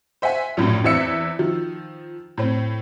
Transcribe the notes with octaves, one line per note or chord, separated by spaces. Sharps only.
C5 E5 F#5 G#5
A#1 F#2 A2
E2 E3 C4 E5 E6 C#7
D#3 F3
A2 C4